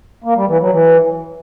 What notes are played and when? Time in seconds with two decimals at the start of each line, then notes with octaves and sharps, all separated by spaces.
0.24 A#3
0.36 G3
0.48 E3
0.60 F#3
0.71 E3